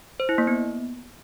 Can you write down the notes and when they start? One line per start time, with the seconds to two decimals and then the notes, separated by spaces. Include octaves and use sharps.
0.20 C5
0.29 E4
0.38 A#3
0.47 B3